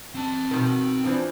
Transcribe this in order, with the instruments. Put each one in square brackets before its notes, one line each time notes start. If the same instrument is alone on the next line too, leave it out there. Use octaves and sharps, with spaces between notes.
[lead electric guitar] C4 A5
[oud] B2 D#3
E3 F3 D4